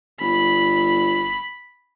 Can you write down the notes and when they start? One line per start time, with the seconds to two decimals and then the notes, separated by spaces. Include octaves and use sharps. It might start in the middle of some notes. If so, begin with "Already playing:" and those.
0.20 G1 B5